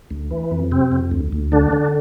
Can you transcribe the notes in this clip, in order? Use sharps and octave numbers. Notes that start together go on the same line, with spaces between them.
D2
E3
F2
C3 C4
F2
D2
D2
D3 D4
D3